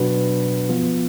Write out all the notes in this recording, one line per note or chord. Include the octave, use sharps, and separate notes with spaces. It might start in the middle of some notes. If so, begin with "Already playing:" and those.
Already playing: B2 F#3 D4 F#4 B4
F3 B3 F4